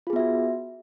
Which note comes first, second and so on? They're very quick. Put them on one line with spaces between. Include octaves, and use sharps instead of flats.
F4 G#4 B3 E5 F#4